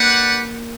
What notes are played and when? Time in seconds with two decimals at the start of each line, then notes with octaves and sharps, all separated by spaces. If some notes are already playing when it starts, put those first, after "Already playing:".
Already playing: A#3 D4 G4 B4 F#5